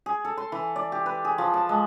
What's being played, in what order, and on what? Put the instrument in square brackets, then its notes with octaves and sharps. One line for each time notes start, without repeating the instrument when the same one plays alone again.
[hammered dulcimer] G#4
A4
C6
E3
D5
G4
B4
G#4
F3
A5
G#3